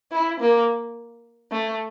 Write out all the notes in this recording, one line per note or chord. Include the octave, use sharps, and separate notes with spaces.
E4
A#3
A3